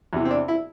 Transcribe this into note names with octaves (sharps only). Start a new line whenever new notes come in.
E2 C3 E3
C4
D4
E4